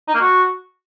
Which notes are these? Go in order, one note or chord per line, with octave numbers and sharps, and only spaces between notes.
D#4
A#3
F#4